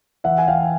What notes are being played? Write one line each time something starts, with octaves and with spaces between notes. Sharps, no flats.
E3 E5 F#5
G#5
E3 F5 G5